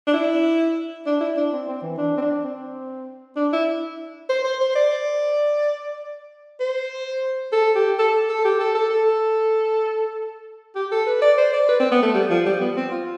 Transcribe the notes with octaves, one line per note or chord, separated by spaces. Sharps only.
D4
E4
D4
E4
D4
C4
C4
E3
D4
C4
D4
C4
D4
E4
C5
C5
C5
D5
C5
A4
G4
A4
A4
G4
A4
A4
A4
G4
A4
B4
D5
C5
D5
B4
C4
B3
A3
G3
F3
G3
B3
C4
F4